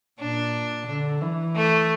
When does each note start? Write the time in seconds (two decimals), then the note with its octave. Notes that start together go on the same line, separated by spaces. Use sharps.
0.20 A#2 D4
0.88 D3
1.22 E3
1.55 A3